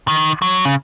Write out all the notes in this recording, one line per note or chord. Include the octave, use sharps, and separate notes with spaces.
D#3
F#3
C#3